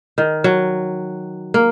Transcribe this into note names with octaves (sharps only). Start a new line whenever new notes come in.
D#3
F#3
A#3